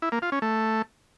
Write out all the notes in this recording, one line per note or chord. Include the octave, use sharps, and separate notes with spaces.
E4
A#3
F4
C#4
A3